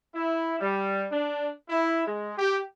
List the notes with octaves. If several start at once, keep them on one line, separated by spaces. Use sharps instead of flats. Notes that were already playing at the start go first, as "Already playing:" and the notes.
E4
G3
D4
E4
G#3
G4